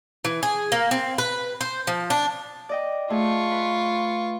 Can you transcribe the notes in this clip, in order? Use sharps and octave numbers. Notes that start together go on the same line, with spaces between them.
E3
G#4
A#3
C4
B4
C5
F3
D4
D5 D#5 G5
A3 F4 G#4 C#6
B4